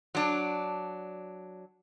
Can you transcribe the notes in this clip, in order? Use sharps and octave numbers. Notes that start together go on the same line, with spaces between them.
F#3 D4